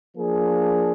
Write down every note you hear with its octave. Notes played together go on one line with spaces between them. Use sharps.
F3 A#3 D4 G#4